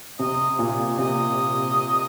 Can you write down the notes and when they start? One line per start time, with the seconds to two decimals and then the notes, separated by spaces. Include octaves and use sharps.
0.19 C3 D#5
0.59 A#2
0.98 C3 D#5